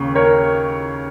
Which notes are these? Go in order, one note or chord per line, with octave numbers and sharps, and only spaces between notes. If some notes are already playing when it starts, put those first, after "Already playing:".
Already playing: D#2 C#3
A#4 C#5